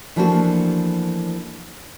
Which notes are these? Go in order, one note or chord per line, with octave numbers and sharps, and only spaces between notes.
E3 F3 A3 A#3 D4 F#4